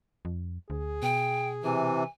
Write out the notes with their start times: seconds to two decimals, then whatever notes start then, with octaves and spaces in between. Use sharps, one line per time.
0.25 F2
0.70 D2 G#4
1.03 B2 G5
1.63 C3 E3 G#5